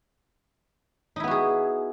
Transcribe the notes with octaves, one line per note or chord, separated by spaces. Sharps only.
B3 D#4 E4 F#4 G#4